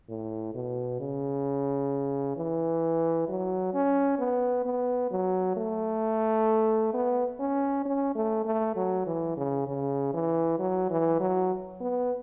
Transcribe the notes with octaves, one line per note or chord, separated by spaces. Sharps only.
A2
B2
C#3
E3
F#3
C#4
B3
B3
F#3
A3
B3
C#4
C#4
A3
A3
F#3
E3
C#3
C#3
E3
F#3
E3
F#3
B3